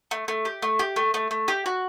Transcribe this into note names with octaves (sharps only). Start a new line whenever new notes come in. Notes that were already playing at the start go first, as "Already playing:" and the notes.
A3
A3
G4
A3
G4
A3
A3
A3
G4
F#4